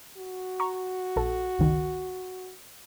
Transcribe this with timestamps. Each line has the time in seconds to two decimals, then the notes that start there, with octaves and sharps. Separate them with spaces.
0.17 F#4
0.60 A#5 C#6
1.16 A#1 A4
1.58 G1 C#2 D#3